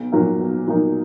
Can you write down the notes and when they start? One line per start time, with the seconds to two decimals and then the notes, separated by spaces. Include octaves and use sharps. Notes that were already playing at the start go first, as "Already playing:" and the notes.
Already playing: B1
0.12 A#2 F#3 A#3 D#4
0.40 B1
0.67 A#2 F#3 A#3 D#4